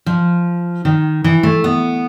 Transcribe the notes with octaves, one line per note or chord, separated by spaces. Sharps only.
F3
D#3
E3
A3
B3